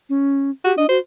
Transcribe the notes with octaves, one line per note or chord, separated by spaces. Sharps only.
C#4
F#4 G4
D4 D#5
F#4 C5